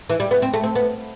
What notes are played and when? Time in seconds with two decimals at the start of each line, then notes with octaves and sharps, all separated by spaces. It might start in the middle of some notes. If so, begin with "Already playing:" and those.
0.10 E3
0.20 G3
0.31 B3
0.42 C4
0.54 A3
0.64 C4
0.75 B3